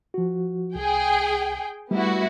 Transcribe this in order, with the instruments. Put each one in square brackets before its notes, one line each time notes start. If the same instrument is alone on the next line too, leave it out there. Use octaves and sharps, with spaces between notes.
[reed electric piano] F3 F#4
[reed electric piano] C2 [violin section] G#4 G5
[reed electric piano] G3 A3 [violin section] B3 E4 F#4